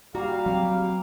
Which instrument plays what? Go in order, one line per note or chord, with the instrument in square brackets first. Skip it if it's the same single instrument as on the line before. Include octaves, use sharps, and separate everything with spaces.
[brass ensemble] G3 F5 [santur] A#3 G4 [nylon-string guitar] F#4
[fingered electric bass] F#3 C4 [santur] G5 C#6